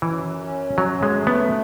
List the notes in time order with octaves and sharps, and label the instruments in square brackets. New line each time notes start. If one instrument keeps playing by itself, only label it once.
[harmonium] F#2 [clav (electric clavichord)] E3
[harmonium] C#4
[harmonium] F#2 [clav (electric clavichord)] F#3
[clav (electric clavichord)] G#3
[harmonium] A3
[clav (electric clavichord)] B3